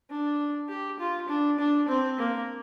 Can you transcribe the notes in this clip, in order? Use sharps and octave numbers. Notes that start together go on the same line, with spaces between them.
D4
G4
F4
D4
D4
C4
A#3